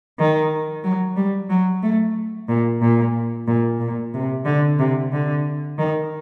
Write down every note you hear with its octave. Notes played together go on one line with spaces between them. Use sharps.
D#3
F#3
G3
F#3
A3
A#2
A#2
A#2
A#2
C3
D3
C3
D3
D#3